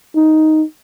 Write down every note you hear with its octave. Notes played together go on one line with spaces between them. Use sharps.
D#4